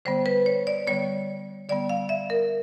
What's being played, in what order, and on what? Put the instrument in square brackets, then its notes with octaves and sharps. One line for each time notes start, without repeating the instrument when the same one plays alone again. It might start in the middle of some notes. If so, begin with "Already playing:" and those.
[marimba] D3 G3 B3 C5
B4
C#5
D5
D3 G3 B3 C#5
D3 G3 B3 D5
F5
E5
A#4